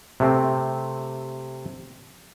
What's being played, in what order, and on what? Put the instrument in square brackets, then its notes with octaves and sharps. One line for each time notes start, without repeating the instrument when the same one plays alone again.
[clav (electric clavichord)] C3 A3 C4